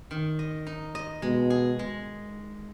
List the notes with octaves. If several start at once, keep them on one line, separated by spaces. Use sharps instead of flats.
D#3
D#5
D#4
D#5
B2 G#3
G#4
G#3